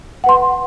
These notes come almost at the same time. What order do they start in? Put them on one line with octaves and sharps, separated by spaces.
F#5 B4 C6